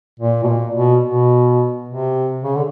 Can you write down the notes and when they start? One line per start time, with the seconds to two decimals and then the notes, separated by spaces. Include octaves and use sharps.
0.19 A#2
0.43 B2
0.47 A#2
0.75 B2
1.04 B2
1.88 C3
2.44 C#3
2.55 D3